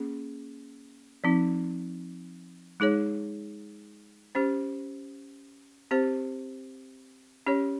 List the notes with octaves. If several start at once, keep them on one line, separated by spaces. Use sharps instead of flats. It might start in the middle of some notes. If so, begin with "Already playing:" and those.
Already playing: A#3 C#4 G#4
F3 C4 D#4
G#3 D#4 G#4 C#5
C#4 G4 C5
C4 G4 C5
C#4 G4 C#5